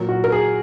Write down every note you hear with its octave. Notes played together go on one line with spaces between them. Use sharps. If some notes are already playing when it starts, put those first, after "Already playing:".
Already playing: A#2 F#3 A#4
F#4
A#4
G#4